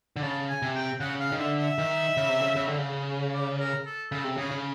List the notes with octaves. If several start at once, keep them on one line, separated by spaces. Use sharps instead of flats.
D3
C#3 A5
G#5
C3
G5
C#3 F#5
F5
D#3
D3 E5
E5
D#3
C#3
C3
C#3
C#3
D3
C#3
D5
A#4
A4
C#3 A4
C3
C#3 G#4
C#3